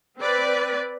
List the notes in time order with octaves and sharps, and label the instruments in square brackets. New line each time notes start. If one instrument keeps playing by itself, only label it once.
[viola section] C4 B4 D5